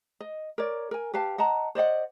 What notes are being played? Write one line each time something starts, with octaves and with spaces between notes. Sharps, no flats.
D#5
A#4 C#5 D5
A#4 G#5
G4 B4 F5 A5
D#5 F#5 A5 A#5
C5 D5 D#5 F#5